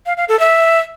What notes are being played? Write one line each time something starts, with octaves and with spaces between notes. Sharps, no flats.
F5
F5
A4
E5